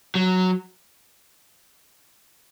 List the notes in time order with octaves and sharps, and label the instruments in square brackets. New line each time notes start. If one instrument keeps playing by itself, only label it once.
[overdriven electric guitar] F#3